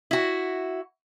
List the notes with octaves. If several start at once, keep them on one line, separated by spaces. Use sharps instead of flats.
E4 F#4